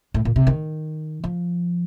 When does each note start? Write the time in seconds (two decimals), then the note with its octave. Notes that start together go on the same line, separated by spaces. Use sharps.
0.14 A2
0.25 A#2
0.36 C3
0.47 D#3
1.24 F3